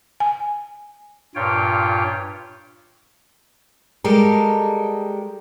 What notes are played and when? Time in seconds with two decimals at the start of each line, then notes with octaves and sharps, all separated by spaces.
0.20 G#5
1.35 G2 A#2 F4 C#5 G5
4.04 G3 G#3 G4 A4 A#4